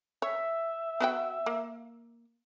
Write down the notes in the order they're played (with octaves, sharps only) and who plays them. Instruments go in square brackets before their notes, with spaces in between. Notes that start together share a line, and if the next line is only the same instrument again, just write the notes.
[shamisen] C#5 [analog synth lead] E5
[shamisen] B3 F#4 G5
A#3